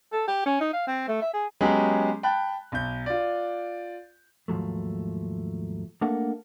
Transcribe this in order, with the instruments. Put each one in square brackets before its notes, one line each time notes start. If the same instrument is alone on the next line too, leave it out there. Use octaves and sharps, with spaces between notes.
[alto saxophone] A4
G4
C#4
D#4
F5
C4
A3
E5
G#4
[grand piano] F#3 G#3 B3 C#4 G4 G#4
G5 A5 B5 F#6
B1 G6
F4 D5
[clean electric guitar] D#2 G#2 F3 F#3 A3
A3 A#3 D4 A4 A#4 F#5